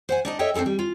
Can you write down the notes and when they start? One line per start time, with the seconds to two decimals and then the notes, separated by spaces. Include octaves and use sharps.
0.09 C5 F#5 G#5
0.25 D4 D#4 D#5
0.39 A4 C#5 D#5 E5 G5
0.54 C4 D4 E4 A4 G#5
0.66 G3
0.79 F4